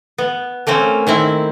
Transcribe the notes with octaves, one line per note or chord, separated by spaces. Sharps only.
B3
A3 A#3 C4 C#4
D#3 C4 E4